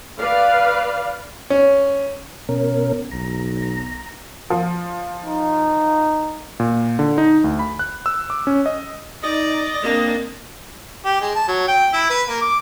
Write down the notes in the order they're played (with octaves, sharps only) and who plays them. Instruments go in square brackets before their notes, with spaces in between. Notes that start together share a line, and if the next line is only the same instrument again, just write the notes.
[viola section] B4 D5 F5
[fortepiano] C#4
[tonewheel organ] B2 C#4 A#4
[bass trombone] B1 [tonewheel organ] A#5
[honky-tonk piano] F3
[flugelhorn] D#4
[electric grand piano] A#2
D3
D#4
D2
B5
F#6
E6
D6
C#4
D#5
[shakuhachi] D#4 [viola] D5 [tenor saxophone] D#5
[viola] A#3 D4 [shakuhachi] C4
[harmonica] G4
G#3
A5
F#3
G5
E4
B4
A#3
D6